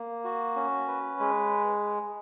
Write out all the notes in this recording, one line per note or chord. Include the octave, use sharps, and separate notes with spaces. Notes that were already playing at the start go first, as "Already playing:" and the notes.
Already playing: A#3
F#4
C#4
B4
G#3